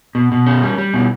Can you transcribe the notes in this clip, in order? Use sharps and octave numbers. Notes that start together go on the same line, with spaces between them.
B2
B2
C#4
G3
G3
B2